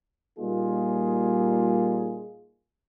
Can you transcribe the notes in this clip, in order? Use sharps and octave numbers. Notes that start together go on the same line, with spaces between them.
A#2 G3 A#3 D#4 F4 G#4